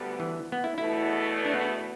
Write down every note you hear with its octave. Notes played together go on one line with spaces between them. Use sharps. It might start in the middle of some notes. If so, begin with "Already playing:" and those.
Already playing: D2 D3 G3 B3
E3
B3
E4
E2 B2 A3 E4
D4
B3